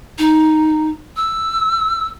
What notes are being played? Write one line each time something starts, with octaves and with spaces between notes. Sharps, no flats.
D#4
E6